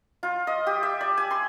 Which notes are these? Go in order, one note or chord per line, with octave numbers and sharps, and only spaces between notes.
F4
D#5
G4
E5
D5
G#5
C6